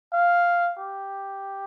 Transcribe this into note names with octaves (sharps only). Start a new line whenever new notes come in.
F5
G4